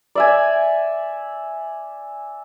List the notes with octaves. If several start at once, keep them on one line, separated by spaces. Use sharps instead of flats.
D5 E5 G#5